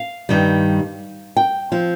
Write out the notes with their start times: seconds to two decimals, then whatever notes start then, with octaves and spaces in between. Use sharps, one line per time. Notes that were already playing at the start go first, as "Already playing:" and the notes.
Already playing: F5
0.29 G2 D#3 G3
1.37 G5
1.72 F3 C4